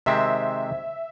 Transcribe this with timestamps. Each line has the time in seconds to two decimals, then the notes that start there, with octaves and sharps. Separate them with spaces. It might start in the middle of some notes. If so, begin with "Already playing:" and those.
0.06 C3 D#3 G#3 C4 E5